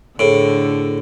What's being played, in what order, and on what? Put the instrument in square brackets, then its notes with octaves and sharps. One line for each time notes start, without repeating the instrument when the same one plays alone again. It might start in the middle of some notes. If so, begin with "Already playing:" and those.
[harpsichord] A2 [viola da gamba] D3 [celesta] G#4 C5 D7